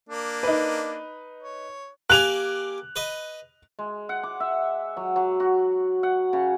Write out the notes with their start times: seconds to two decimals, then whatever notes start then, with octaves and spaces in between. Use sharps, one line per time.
0.09 A#3 D4
0.43 D#4 B4
1.43 C#5
2.10 A#3 G4 G#5 F#6 F7
2.96 B4 D#5
3.79 G#3
4.09 F#5
4.23 D6
4.40 E5
4.97 F#3
5.16 F#3
5.40 F#4
6.03 F#5
6.33 C#3